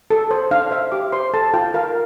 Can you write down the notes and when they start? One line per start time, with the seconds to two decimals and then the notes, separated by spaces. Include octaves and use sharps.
0.10 A4
0.31 C5
0.51 D4 F5
0.71 C5 E5
0.92 G4 D6
1.12 C5 C6
1.34 A4 A5
1.54 F4 G5
1.74 A#4 F5